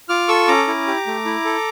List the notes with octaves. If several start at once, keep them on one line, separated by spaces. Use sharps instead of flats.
F4 D6 F6
A4 C#6 E6
C#4 A#5 D6
E4
G4
A3
E4
A4